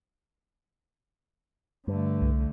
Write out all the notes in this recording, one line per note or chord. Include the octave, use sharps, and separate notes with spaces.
G2 D3 A3
C2